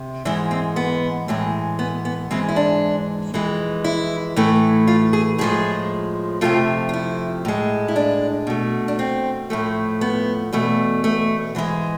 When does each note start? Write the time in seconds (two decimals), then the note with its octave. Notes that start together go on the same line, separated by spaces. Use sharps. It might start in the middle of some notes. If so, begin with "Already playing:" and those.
Already playing: C3
0.25 G#2 E3 G#3 E4
0.51 C4
0.76 B3
1.28 A2 E3 G#3
1.79 B3
2.05 B3
2.31 G#2 E3 G#3 C4
2.49 E4
2.56 D4
3.34 F2 E3 G#3
3.84 E4
4.36 A2 E3 A3
4.87 F4
5.13 G#4
5.38 A2 F3 G#3 G#4
6.41 F2 C3 F3 A3 F4
6.89 F4
6.93 E4
7.45 A2 G#3
7.88 E4
7.96 D4
8.47 B2 A3
8.88 D4
8.99 C4
9.50 A2 F3 A3
10.01 B3
10.53 E2 B2 A3
11.04 A3
11.55 G#2 E3 G#3